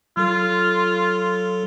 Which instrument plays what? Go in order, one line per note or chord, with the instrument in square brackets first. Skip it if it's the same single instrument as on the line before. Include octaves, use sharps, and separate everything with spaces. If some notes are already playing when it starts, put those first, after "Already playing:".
[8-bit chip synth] F#3 A4 [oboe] F4